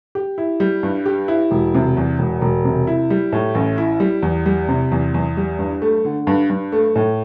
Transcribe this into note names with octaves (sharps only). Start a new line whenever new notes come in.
G4
E4
G3
G2
G4
E4
E1
C3
E2
E1
E1
C3
E4
G3
A2
A1
E4
G3
E2
G3
C3
E2
E2
G3
G2
A3
D3
G2
G2
A3
A2